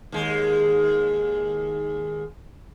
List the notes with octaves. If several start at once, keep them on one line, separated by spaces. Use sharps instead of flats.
D#2 G#3